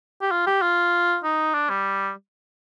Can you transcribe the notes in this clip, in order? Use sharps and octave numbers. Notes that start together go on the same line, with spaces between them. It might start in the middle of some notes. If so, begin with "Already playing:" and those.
G4
F4
G4
F4
D#4
D4
G3